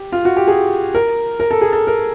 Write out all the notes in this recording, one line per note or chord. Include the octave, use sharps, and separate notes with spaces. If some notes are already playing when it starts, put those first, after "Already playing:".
Already playing: G4
F4
F#4
G4
G#4
A#4
A#4
A4
G#4
A4
A#4